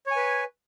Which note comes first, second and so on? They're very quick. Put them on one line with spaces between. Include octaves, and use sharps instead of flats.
C#5 G#5 B4